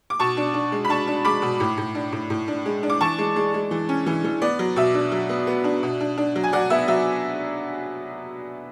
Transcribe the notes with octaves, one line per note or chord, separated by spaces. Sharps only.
D6
B2 A5 C#6
D4
D4
G#3
B5
D4 A5 C#6
D4
G#3 B5 D6
B2
A2
A2
D4
A2
A2
D4
G#3
D4
D6
E3 A5 C#6
G#3
G#3
G#3
E3
C#4
E3
E3
B3 D5
F#3
B2 E5
D4
F#3
B3
B3
D4
B2
D4
D4
F#3
G#5
F#3 D5 F#5
B3 E5
F#3 E5